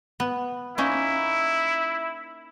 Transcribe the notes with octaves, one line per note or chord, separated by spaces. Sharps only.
B3
A#3 C#4 D#4 E4